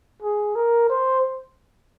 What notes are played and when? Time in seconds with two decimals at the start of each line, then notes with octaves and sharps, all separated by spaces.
0.23 G#4
0.56 A#4
0.89 C5